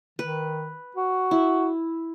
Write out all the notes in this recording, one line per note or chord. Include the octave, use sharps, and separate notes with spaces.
D#3 B4
F#4
E4